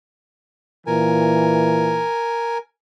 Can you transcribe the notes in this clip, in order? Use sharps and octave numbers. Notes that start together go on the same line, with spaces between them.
A#2 E3 A#4 G#5